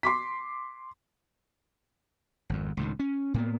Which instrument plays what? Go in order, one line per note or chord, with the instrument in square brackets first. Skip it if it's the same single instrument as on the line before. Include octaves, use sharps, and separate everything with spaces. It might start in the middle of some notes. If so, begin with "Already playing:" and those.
[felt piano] C6 D6 B6
[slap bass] G#1 F2
C#2 A2 D#3
C#4
A2 A#3 B3